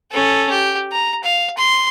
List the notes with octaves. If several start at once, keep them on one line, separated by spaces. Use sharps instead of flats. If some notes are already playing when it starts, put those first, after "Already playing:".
C#4 A4
G4
A#5
F5
C6